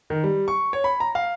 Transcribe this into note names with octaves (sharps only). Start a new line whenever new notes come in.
D#3
G3
C#6
C#5
B5
A#5
F5